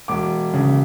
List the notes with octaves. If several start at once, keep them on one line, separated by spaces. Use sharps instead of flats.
E1 D6
C#3